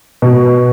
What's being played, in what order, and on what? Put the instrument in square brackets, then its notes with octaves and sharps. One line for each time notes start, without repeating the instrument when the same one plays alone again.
[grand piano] B2